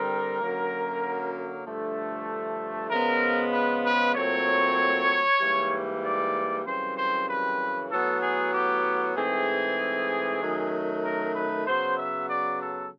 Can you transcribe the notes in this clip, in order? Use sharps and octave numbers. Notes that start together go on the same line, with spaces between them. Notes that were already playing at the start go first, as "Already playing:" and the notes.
Already playing: D3 G3 C4 A#4
F#2 D3 F#3 A#3
G2 D3 F3 A3
C#3 F3 G#3 B3 A#4
B4
B4
A#2 F#3 A3 C4 C#5
G#2 E3 G3 A#3
D5
F#2 C#3 E3 G3 C4 C5
C5
B4
A2 F#3 B3 A4
G#4
G4
G#2 E3 A3 C4 G#4
F#2 D#3 F#3 A3
A#4
B4
C#3 F#3 B3 C5
E5
D5
A4